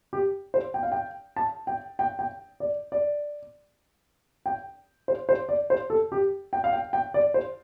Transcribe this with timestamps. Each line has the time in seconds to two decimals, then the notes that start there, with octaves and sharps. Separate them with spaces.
0.13 G4
0.54 C5
0.74 G5
0.83 F5
0.92 G5
1.36 A5
1.67 G5
1.99 G5
2.19 G5
2.60 D5
2.92 D5
4.46 G5
5.08 C5
5.29 C5
5.49 D5
5.70 C5
5.90 A4
6.12 G4
6.53 G5
6.64 F5
6.73 G5
6.93 G5
7.14 D5
7.34 C5